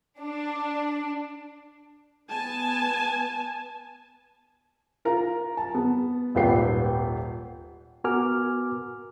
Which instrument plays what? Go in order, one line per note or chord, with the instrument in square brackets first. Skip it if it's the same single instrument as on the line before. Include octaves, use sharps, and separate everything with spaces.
[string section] D4
[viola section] B3 G#5 A5
[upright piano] F4 A#4 A#5
A5
B3
D#1 G#1 F4 B4 G5 C7
[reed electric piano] B3 F#4 A#4 G#5 D6 F6